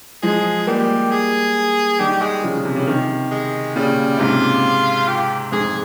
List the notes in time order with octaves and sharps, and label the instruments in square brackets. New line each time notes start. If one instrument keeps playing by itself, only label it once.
[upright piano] F3 G#3 [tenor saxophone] G#4
[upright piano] G3 A#3 [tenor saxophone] G4
[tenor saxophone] G#4
[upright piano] D#3 G3 [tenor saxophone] G4
[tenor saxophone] G#3
[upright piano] C#3 F3
C3
C#3
C3 D#3
[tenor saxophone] G#3
[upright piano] A#2 C#3 [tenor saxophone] G3
[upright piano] G#2 C3 [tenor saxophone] F4
[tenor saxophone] G4
[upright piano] F2 G#2 [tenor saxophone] G#4